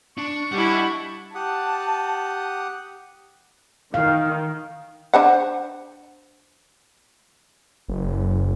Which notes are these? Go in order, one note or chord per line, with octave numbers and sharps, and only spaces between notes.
D4 C#6
G3 D4 E4 D#5 F#5
G4 F#5 A5 D#6
D#3 F5
D4 C5 F#5
F#1